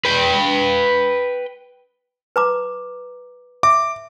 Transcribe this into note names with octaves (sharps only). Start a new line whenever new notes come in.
B4 G5
B4 A#5 D6
E5 D6